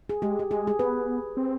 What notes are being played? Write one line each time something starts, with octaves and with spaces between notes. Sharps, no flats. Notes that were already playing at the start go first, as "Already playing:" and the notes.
G#4
G#3 G4
G4
G#3 G#4
G#4
B3 B4
C4